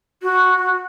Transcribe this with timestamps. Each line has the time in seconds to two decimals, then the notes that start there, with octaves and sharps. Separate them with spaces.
0.22 F#4